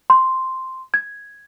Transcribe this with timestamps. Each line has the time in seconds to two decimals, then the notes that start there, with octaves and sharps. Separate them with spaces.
0.10 C6
0.94 G#6